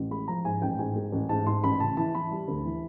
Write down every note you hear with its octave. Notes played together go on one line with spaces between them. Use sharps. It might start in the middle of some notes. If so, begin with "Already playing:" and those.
Already playing: A1
G#3 B5
F3 A#5
G#2 G#5
A1 G5
G#2 G#5
G#3
A1
G#2 A5
G#2 C6
A1 B5
C#3 A5
E3 A5
E3 B5
G3
D2
E3